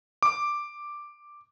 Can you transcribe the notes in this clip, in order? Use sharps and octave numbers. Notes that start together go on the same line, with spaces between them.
D6